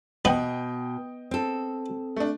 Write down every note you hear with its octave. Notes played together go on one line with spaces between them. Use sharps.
B2 B3 D#5 G5
C4 A4
A3 D4